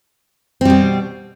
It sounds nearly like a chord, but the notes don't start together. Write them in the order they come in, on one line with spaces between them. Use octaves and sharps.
C4 G3 B2